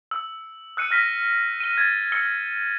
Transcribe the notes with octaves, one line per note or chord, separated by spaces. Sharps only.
E6
E6 F#6 C#7 D#7
F6 A#6 B6
D#7 G7
G#6 A6
E6 C#7 G7